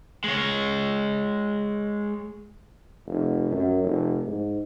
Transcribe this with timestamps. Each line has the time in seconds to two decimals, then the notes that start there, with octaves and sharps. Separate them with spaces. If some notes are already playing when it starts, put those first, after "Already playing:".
0.24 G#3 C#5
3.06 F1
3.51 F#2
3.84 F1
4.26 G#2